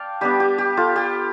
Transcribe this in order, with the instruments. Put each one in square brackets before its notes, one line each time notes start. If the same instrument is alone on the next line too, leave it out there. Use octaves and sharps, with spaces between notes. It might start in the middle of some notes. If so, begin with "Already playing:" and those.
Already playing: [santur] D5 F5 G5 A5
G3 B3 D4 G4
G4
G4
F4 A4
G4